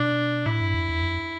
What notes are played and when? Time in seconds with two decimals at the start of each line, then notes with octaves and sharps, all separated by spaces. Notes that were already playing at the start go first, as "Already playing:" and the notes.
Already playing: B2 D4
0.46 A2 E4
0.60 G2
0.74 F2
0.89 E2
1.03 F2